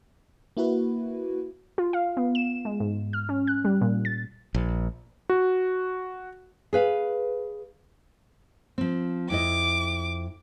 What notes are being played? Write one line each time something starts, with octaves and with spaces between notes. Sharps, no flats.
A#3 E4 F#4 B4
F4
F5
B3
E7
G#3
G#2
F6
C#4
F#6
G3
A#2
A6
A#1
F#4
G#4 B4 F5
F3 C4
F2 E4 D#5 D6